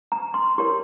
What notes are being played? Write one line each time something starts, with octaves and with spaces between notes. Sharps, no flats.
A#5
C6
E4 G4 A#4 C#5 C6